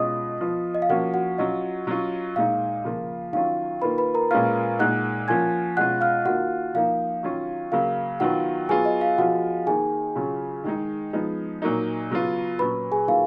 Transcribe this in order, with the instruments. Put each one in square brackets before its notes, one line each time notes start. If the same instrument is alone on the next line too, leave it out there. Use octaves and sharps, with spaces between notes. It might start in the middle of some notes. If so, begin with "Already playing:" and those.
Already playing: [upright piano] B2 G#3 C#4 F4 [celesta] D#5 D#6
[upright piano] F3 B3 F4
[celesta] D#5
F5
[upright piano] F3 A#3 C#4 [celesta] F#4 F#5
[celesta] F#4 F#5
[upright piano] F#3 C#4 F4 [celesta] D#5
[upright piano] F#3 C#4 F4
[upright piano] A#2 G#3 D#4 [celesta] F5
[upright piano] C#3 F3 A#3 F4
[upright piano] D#3 F#3 C#4 F4 [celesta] F5
[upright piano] D#3 A#3 F4 [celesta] B4 B5
[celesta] B4 B5
A#4 A#5
[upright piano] A#2 G#3 C#4 F4 [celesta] F5 F6
[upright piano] A#2 G#3 D#4 [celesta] F#5 F#6
[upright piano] F3 A#3 C#4 F4 [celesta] G#5 G#6
[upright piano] B2 G#3 C#4 F4 [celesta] F#5 F#6
[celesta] F5 F6
[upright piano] D#3 A#3 F4 [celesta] F#4 F#5
[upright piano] F3 A#3 D#4 [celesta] F5
[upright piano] D#3 F#3 C#4 F4
[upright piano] C#3 F#3 A#3 [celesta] F5
[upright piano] D#3 F#3 B3 F4 [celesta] F#4 F#5
[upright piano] F#3 B3 F4 [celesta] G#4 G#5
[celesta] D#5
F5
[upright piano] F3 B3 F4 [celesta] F#4 F#5
[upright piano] D#3 A#3 D#4 [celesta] G#4 G#5
[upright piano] C#3 F#3 C#4 F4
D#3 G#3 D#4
F3 G#3 B3 D#4
A#2 F#3 A#3 D#4
C#3 F#3 B3 F4
[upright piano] A#2 F#3 C#4 [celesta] B4 B5
[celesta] G#4 G#5
[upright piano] D#3 F#3 A#3 F4 [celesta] F5